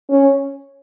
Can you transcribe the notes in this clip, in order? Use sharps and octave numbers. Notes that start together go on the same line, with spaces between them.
C#4